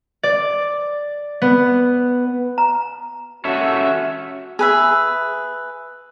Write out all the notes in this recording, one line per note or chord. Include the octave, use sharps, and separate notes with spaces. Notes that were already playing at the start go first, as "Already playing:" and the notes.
D5
B3
A#5
C#4 F#4 A4 E5
G#4 B4 E5